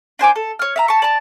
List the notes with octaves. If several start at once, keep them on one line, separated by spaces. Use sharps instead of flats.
D4 C5 G#5 D6
A4
C#5 F6
E5 F5 A#5
A5 C#6
D5 A5